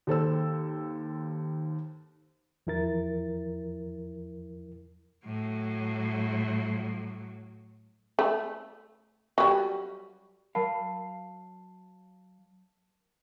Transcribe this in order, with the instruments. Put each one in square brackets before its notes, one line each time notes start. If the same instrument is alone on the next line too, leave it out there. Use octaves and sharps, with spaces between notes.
[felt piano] D#2 A4 C5 E6
[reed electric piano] E2 F3 E4 A#4 A6
[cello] A2 F#3
[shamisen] A3
F#3 G3
[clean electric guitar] F#3 F5 [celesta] A#4 A5 B5